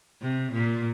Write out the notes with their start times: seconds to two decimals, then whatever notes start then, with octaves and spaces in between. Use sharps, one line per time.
0.22 C3
0.53 A#2